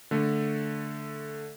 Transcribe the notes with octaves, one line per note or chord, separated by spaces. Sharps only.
D3 A3